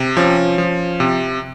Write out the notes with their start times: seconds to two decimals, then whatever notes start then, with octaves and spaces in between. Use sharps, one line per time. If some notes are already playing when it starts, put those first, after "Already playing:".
Already playing: C3
0.17 F3 C#4
0.58 F3
1.00 C3